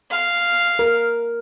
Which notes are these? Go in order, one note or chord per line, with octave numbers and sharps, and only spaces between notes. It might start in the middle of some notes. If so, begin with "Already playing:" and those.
F5
A#4